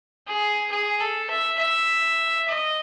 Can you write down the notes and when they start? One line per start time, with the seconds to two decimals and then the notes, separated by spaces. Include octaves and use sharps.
0.27 G#4
0.71 G#4
1.00 A4
1.30 E5
1.59 E5
2.48 D#5